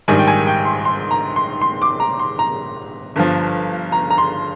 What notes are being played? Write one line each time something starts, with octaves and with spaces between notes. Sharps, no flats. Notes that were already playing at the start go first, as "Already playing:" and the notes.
A#1 G#2 D#3 G3 G#5
G5
G#5
G5
C6
C6
A#5
C6
C6
D6
A#5
C6
A#5
G1 G2 F3
A#5
A#5
C6